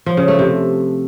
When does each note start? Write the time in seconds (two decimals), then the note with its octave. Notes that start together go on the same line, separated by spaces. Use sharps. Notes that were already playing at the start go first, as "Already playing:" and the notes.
0.06 F3
0.17 C#3
0.28 A3
0.39 C3